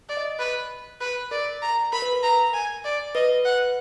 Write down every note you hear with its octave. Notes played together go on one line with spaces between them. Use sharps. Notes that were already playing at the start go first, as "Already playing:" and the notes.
D5
D#5
B4
B4
A#4 D5
A#5
A#4 B5
B4
A#4
A#5
G#5
D5
B4 D#5
F#5